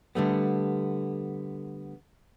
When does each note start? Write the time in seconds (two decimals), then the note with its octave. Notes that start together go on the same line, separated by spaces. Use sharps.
0.15 D3 G3 A3 B3